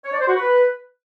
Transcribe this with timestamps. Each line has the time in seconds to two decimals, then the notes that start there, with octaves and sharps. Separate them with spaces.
0.04 C#5
0.12 D5
0.20 C5
0.28 F#4
0.36 B4